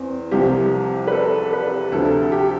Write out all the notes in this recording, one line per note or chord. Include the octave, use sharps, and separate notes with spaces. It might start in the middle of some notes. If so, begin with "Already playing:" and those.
Already playing: E2 C4
C2 C3 F3 G4
B4
A4
B4
D2 C3 F3 A4
G4